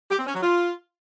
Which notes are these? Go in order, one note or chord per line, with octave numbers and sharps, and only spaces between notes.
G4
C4
C#4
F#3
F4